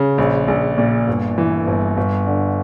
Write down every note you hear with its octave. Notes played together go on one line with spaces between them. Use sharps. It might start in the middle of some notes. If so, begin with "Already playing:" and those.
Already playing: C#3
A#1
A#1
A#2
G1
E3
G1
G1
D3